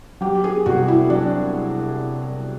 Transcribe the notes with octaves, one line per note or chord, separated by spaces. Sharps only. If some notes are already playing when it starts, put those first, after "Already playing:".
F#3 G4
G#4
C2 F#4
E4
F#3 D4